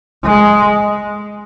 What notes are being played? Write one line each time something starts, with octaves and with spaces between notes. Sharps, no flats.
G#3